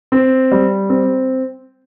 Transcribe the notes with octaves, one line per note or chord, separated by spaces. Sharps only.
C4
G3
C4